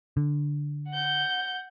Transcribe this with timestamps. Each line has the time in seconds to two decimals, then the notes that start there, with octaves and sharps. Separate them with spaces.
0.17 D3
0.89 F#5 G6